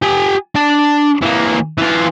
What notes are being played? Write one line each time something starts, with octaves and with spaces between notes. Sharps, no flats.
G4 G#5
D4 A5
E3 A#3
E3 F4